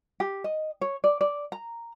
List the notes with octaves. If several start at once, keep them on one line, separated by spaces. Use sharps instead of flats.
G4
D#5
C#5
D5
D5
A#5